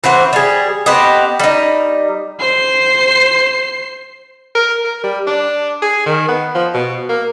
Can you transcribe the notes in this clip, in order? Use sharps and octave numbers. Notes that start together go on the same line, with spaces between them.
E3 C4 F#4 C5
G3 G#4
B3 C4 G4 D#5
G3 D#4
C5 C7
A#4
A#4
G3
D4
G#4
D#3
B3
F3
B2
A#3